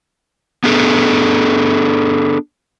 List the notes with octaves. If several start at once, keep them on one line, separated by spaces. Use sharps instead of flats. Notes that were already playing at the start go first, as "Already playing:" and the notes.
B3 D4 G#4 A4